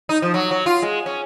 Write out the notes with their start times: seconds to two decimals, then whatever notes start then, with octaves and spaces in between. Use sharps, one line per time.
0.09 D#4
0.22 F3
0.34 F#3
0.51 F#3
0.66 F4
0.82 G#3
1.06 C#4